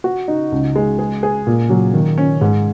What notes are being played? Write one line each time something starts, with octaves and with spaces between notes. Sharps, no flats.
F#4
D#4
C#2
G#3
G#4
G#4
A#2
F#3
D#3
C#4
G#2